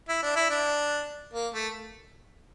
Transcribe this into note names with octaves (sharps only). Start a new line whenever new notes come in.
E4
D4
E4
D4
A#3
A3